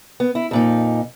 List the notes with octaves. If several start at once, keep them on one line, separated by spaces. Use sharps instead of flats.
B3
E4
F2 A#2 D#4